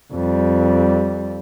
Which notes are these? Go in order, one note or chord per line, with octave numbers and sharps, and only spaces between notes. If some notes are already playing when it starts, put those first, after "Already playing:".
F2 G3